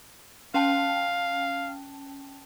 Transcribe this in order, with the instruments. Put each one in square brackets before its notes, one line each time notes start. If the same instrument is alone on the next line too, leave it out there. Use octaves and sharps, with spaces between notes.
[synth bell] C#4 G5 A5 [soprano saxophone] F5